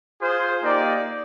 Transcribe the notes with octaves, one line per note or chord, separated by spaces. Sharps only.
F4 G#4 C5
A#3 D#4 G4 D5